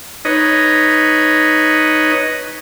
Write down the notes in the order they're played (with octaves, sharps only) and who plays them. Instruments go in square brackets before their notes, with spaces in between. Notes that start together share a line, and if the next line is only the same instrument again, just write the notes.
[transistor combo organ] D#4 B4 C#5 D#5